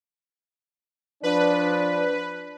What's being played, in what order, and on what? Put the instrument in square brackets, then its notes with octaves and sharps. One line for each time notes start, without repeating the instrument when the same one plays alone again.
[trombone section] F3 D4 [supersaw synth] B4